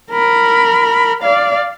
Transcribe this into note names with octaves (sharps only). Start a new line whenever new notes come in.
A#4 B5
D5 F5